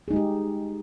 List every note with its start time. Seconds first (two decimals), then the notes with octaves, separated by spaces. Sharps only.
0.08 G#4
0.11 D#4
0.13 G#3
0.16 G4